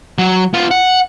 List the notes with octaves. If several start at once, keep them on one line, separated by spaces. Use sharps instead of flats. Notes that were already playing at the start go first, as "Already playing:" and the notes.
F#3
B3 F4
F#5